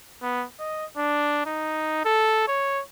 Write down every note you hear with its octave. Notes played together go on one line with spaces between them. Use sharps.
B3
D#5
D4
D#4
A4
C#5